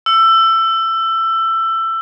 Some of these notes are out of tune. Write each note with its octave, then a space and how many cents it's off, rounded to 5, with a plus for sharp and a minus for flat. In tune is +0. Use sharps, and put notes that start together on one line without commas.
E6 +20